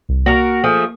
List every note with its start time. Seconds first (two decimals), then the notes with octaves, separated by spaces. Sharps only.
0.09 C2
0.26 A#3 F#4 A#4
0.64 F3 A3 G#4